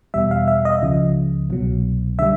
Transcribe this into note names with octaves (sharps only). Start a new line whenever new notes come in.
E2 B2 G3 E5
F5
E5
D#5
C#2 C#3 F3
C2 B2 F#3
D3 G3 E5